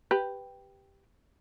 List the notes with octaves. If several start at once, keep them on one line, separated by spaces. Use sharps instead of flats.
G4 B4